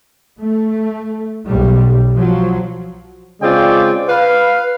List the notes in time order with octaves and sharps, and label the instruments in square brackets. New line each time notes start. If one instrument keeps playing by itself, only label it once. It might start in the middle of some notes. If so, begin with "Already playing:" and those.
[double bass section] A3
B1 G3
F3 F#3
[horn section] C#3 G#3 C4 F4 D5 G5
B4 F5